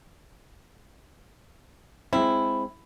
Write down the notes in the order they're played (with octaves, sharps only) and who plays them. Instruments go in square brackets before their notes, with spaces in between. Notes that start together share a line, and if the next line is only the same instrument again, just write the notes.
[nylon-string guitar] G#3 C4 [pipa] E4